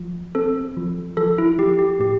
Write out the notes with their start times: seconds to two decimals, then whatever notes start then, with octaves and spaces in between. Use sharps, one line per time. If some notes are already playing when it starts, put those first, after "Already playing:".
Already playing: F3
0.35 C4 A4
0.77 F3
1.17 F3 A4
1.38 E4
1.58 F3 G4
1.79 G4
1.99 A2 G4